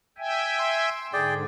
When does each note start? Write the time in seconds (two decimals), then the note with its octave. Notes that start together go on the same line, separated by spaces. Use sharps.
0.18 E5 G5 G#5
0.59 C6
1.13 G#2 D3 G#4 D5 G5